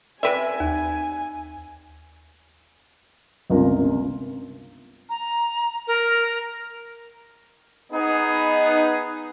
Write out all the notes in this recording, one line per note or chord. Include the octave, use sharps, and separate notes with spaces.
C3 B4 D5 E5 G5 G#5
D#2
G1 C#2 C3 F4 A#4
A#5
A#4
B3 D#4 G#4